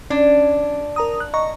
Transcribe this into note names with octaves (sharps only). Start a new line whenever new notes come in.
C#4 D4
A#4 A#5 D#6
F#6
D#5 A#5 C#6